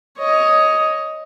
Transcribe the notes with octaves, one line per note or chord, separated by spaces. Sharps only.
C#5 D#5